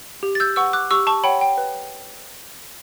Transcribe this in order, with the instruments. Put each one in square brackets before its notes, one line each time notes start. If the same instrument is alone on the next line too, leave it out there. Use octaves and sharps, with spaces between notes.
[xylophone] G4
A6
E6 G6
B4 F#5 C#6 E6
D6 F#6
G4 C#6 E6
A5 C#6
C#5 F#5 G5 B5
G5
B4